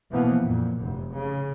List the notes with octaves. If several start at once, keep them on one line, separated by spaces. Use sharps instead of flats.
B2 E3 F3 A#3 B3
F2 A#2
F1 F#2
C#3